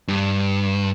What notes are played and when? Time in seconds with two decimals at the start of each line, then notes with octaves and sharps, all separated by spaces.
0.08 G2